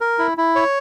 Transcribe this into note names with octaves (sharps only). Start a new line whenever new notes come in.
A#4
E4
E4
C#5